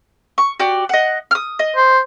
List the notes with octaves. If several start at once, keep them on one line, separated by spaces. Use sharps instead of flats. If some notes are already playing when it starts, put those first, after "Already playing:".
C#6
F#4 G4 D5
D#5 F#5
D#6 F6
D#5
C5